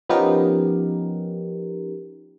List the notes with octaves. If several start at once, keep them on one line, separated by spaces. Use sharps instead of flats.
F3 B3 C#4 D#4 G4 A#4